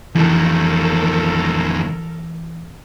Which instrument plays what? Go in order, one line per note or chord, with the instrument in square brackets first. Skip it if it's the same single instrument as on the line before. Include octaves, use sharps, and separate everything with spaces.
[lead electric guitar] F2 D#3 [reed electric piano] E3 [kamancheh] A4 A#4